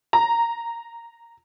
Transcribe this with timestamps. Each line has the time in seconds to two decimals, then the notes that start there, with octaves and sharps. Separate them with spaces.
0.13 A#5